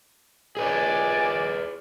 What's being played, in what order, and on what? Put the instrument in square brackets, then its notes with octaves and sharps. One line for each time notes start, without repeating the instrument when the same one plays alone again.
[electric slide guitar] G#4 B4 C#5 [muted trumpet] D5 [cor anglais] G#5